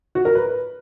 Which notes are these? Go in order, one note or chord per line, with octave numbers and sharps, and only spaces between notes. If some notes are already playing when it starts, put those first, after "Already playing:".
F#4
A#4
B4